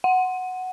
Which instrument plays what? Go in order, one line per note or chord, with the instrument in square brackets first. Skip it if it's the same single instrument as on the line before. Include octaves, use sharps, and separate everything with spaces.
[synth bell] F#5